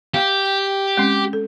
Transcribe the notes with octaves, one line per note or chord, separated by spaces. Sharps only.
G4 F5
G#3 C4 C#4
A4